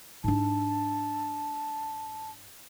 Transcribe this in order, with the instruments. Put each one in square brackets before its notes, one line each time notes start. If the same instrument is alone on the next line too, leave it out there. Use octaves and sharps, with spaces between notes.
[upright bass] G#2 D4 [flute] A5